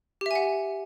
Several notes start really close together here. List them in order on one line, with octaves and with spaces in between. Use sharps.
G4 E5 G#5 F#5